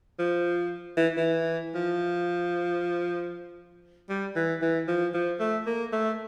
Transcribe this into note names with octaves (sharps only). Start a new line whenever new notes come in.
F3
E3
E3
F3
G3
E3
E3
F3
F3
A3
A#3
A3